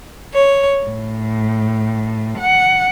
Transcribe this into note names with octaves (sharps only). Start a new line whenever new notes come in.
C#5
A2
F#5